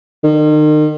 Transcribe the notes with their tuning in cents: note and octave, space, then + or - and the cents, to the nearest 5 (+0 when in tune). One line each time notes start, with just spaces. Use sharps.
D#3 -35